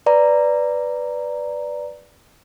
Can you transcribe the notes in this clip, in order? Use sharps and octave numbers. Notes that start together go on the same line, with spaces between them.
B4 D5 A#5